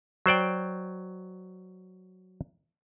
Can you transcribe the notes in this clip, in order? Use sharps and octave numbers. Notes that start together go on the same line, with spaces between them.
F#3 C5 D5 G5